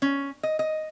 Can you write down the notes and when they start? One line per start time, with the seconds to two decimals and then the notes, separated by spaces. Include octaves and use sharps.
0.02 C#4
0.43 D#5
0.59 D#5